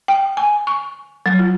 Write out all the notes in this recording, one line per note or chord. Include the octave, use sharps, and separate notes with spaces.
G5
G#5
C#6
F#3
F4